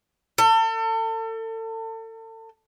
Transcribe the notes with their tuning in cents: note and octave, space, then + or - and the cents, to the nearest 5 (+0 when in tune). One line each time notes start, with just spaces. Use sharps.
A4 +35